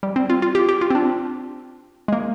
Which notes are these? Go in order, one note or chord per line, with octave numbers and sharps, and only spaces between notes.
G3
C4
F4
F4
G4
G4
F4
C4
D4
G#3
A#3